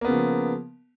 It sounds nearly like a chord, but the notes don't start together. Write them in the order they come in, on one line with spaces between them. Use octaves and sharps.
A#3 B3 C#3 F3